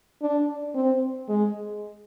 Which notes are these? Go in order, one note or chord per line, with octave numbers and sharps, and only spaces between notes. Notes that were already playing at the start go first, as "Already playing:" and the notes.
D4
C4
G#3